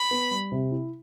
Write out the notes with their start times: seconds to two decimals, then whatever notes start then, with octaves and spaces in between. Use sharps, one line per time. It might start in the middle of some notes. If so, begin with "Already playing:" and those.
Already playing: B5
0.11 B3
0.31 G3
0.52 C3
0.71 E4